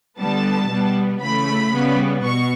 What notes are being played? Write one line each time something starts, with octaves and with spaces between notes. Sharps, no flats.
D3 G3 B3 A5
B2 G3 B3
C#3 E3 A3 B5
C#3 G3 B3
B2 C#6